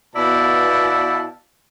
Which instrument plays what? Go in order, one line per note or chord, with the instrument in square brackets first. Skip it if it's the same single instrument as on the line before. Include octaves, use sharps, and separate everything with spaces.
[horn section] B2 B3 E4 D5 F5 A5